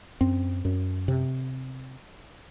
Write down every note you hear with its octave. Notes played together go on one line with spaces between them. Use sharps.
F#2 C4
F#2
C3